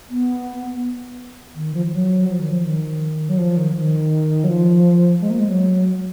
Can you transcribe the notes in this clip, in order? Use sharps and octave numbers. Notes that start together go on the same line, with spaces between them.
B3
D#3
F3
F3
F#3
F3
D#3
F3
D#3
F#3
F3
D#3
D#3
F#3
F3
G#3
A#3
G#3
F#3